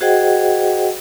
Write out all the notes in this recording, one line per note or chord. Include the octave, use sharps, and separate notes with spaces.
F#4 G#4 C5 D#5 F#5 G5